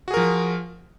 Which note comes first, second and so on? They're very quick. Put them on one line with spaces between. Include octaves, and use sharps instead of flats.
F#4 G#4 A#4 F3